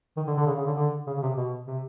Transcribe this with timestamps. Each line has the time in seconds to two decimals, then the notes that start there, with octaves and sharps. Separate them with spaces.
0.17 D#3
0.27 D3
0.37 D3
0.46 C#3
0.57 C#3
0.66 D3
0.76 D3
1.07 C#3
1.17 C#3
1.22 C3
1.37 B2
1.67 C3